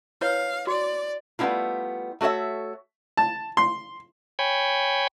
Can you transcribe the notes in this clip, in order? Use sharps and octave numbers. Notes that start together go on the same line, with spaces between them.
E4 B4 C#5 F5
F#4 D5
G3 A3 B3 C#4 E4 F4
A3 F#4 A4 C#5 E5
A5
C6
C#5 G5 G#5 B5